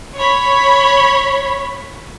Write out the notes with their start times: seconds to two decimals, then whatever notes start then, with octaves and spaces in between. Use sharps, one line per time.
0.17 C#5 B5